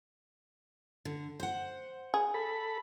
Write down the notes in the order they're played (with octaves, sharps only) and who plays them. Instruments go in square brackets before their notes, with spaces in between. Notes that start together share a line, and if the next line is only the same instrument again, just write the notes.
[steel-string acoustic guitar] D3
C5 F#5
[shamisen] G#4
[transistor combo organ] A4 B5